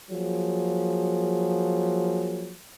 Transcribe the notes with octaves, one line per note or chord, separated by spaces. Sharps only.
F3 F#3 A#3 G#4